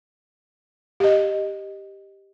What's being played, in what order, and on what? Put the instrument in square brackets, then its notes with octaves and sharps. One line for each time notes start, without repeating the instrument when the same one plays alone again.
[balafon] G4 D#5